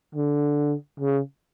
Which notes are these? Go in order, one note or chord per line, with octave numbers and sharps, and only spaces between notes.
D3
C#3